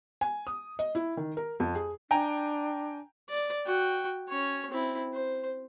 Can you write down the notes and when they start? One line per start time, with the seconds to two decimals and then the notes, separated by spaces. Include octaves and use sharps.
0.21 G#5
0.47 D#6
0.79 D#5
0.95 E4
1.17 D#3
1.37 A#4
1.60 F2
1.75 G#4
2.11 D4 G5 G#5 A#5
3.30 D5
3.67 F#4 G5
4.29 C#4 C#5
4.70 C4 E4
5.14 C5